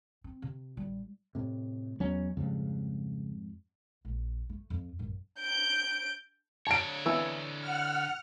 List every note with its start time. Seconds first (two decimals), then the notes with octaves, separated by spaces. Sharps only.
0.24 C4
0.42 C3
0.77 A1 G3
1.35 A2 C3
2.00 E2 F#3 B3 C#4
2.37 F2 G#2 C#3 G3
4.05 A#1
4.49 A3
4.70 F2
4.99 A1 F#2
5.40 G6 D7
6.67 D3 C#5 A5 D7
7.06 E3 E6
7.60 F#5 F6